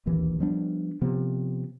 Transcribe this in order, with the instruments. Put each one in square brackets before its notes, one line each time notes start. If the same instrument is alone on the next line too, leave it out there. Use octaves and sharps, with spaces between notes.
[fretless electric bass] D1 A#1 D#2 E3
F3 G3 B3 D4
C3 F3 B3